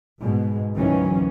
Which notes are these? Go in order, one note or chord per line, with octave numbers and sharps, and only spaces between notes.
G#2 B2 G#3
D2 D#3 E3 F#3 C#4